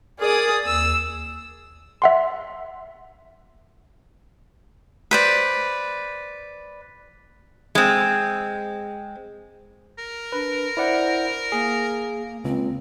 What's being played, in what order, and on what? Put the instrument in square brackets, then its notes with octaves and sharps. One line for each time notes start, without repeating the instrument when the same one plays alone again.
[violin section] G#4 D5 D#6 [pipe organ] A#4
[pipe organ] D#2 [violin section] E6
[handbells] E5 F#5 C6
[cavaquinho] B4 C5 D5
[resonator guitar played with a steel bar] G#3 C4
[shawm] A#4
[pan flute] D4 [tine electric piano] B4
[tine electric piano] E4 D5 F#5 [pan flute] C5
[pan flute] A#3 [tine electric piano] G#4
[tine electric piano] C#2 [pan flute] C4